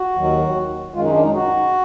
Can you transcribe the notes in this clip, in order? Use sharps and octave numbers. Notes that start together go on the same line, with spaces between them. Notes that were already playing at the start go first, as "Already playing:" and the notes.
Already playing: F#4
D#2 D#3 F#3
F#2 D#3 G#3 F4
D#4
D4
D#4
F#4